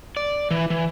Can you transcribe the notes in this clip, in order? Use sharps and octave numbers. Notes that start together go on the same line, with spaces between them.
D5
E3
E3